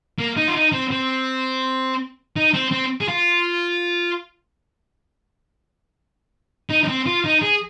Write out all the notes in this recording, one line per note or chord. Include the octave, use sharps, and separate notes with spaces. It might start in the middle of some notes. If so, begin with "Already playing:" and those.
A#3
D#4
F4
D#4
C4
C4
D#4
C4
C4
G#4
F4
D#4
D#4
C4
F4
D#4
G#4